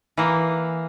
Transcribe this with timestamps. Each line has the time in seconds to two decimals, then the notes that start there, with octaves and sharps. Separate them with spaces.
0.17 E3 A#3